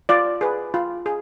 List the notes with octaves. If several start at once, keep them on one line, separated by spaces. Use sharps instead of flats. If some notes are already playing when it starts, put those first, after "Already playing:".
F4 D5
G#4 B4
F4
G#4